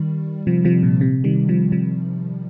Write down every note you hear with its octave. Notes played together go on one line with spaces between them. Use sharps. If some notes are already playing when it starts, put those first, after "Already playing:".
Already playing: D#3 G3
C3 F3
C3 F3
A#2
C3
D#3 G3
C3 F3
C3 F3